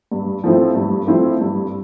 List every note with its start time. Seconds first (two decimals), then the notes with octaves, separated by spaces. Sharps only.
0.12 G2
0.44 F3 A3 C4 E4
0.75 G2
1.07 F3 A3 C4 E4
1.40 G2